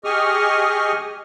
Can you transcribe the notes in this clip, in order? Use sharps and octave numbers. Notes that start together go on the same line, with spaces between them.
G4 G#4 D#5 C#6 D#6 F6